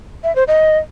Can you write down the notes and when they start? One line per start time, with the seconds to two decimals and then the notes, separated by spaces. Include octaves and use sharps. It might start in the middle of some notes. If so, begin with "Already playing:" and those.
0.24 E5
0.36 C5
0.48 D#5